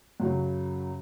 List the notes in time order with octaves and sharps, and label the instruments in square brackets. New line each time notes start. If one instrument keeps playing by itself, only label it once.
[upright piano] F#2 C#3 F#3